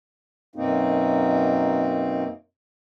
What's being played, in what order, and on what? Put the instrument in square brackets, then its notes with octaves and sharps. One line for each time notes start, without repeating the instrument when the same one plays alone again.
[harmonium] F#2 B2 A#3 C4 D#4